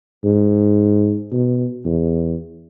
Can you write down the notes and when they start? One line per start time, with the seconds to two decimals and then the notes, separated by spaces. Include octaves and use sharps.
0.24 G#2
1.32 B2
1.85 E2